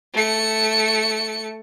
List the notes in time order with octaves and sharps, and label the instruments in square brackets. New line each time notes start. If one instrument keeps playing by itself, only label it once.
[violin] A3 C#7